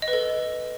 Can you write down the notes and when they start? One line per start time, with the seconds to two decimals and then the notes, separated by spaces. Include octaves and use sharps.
0.02 D#5
0.08 B4
0.13 A4